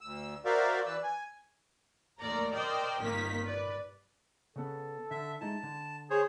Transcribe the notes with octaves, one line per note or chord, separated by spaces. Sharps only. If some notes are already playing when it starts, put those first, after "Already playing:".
D2 E6
F#4 A#4 C5 D5 E5 F5
E3 B4 D5 E6
G#5
D#2 A3 A#4 D5 A#5
A#4 C5 D5 D#5 G5
G1 C3 D#3 A#3 A#4 B6
B4 D5
C#3 B3 A4
D3 E5
G#3 D#4 E4 A5
D3
G#4 C5 C#5